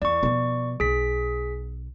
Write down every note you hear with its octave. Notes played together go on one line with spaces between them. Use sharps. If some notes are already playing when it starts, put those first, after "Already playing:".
E2 D5 C#6
B2 F3
B1 G#4 B6